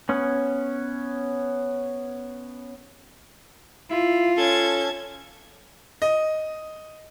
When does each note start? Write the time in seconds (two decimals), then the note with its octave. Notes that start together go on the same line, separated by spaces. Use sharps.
0.09 B3 C#4
3.91 E4 F4
4.37 C#4 A4 A5 G#6
6.02 D#5